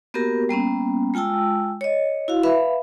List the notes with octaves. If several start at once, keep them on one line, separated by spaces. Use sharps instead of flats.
A#3 B3 F#4 G4 A#4
G3 A#3 B3 C#4
G#3 F4 G5 A5 E6
C#5 D#5
E4 F#4 F5
B4 E5 F5 B5